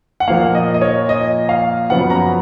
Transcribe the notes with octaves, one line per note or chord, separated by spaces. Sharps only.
F#5
A#2 F3 A#3 F5
D#5
D#5
C#5
D#5
F5
F#2 C#3 F3 B3 F#5
A#5